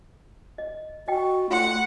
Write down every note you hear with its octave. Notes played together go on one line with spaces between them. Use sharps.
D#5
F#4 D#5 G5
A3 F4 F#5 C6